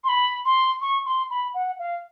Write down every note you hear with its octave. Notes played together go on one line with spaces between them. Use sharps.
C6
B5
C6
C#6
C6
B5
F#5
F5